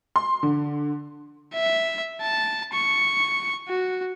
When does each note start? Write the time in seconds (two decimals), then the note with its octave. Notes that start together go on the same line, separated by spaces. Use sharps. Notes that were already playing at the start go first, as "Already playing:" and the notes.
0.16 C6
0.43 D3
1.54 E5
2.21 A5
2.73 C#6
3.68 F#4